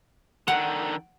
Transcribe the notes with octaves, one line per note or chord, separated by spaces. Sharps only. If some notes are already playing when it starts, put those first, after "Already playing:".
D3 D#3 F#5